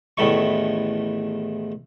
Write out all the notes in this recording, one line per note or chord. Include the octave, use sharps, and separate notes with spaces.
A1 E2 D#3 A3 E4 C#6